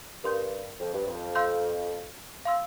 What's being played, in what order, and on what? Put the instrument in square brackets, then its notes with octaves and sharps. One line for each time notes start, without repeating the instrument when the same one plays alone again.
[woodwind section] G2 [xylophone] A#4 F5 C6 G6
[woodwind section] F2
G2
F2
[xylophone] F5 C6 E6 G6
F5 C6 E6